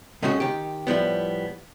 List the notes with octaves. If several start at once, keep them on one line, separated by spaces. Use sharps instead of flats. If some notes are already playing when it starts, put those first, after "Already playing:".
A2 G#3 A3 C#4 F#4
D#3 G4
A2 F3 G3 B3